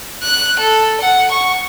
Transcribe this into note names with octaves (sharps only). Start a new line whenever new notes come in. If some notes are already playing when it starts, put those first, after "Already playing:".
F#6
A4
F#5
C#6